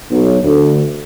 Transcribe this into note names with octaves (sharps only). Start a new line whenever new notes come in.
B1
D2